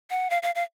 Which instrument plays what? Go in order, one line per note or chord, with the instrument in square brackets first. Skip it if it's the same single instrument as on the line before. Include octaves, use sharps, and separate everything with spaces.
[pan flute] F#5
F5
F5
F5